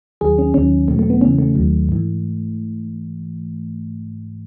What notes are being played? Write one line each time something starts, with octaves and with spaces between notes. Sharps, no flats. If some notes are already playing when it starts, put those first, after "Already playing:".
D#2 D#3 F#3 G#4
C#4
D#2 D#3 F#3 C#4
E2 B2 F#3 A3
A3
B3
E2 C#3 E3 C#4
A3
D#2 D#3 F#3
G#2 E3